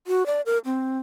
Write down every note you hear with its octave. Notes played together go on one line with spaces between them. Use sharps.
F#4
D5
A#4
C4